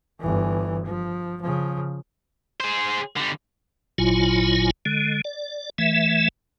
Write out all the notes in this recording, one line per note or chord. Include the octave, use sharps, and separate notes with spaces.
G1 E3
F3
C#3 F3
G#4 C5
D3 G3
G#1 A#2 F#3 E4 F4 G#5
D3 G#3
D5
E3 A3 E5